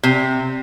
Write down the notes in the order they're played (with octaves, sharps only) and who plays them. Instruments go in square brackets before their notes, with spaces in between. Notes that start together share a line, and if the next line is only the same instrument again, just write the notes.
[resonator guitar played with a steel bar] C3